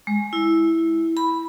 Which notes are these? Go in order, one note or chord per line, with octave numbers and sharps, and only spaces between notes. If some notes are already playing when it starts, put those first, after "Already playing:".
G#3
E4
B5